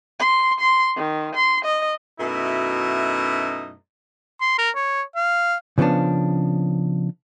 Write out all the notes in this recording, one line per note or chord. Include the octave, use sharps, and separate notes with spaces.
C6
C6
D#3
C6
D#5
F#2 B2 A3 D#4 E4
C6
A#4
C#5
F5
C#3 F3 B3 C#4 D4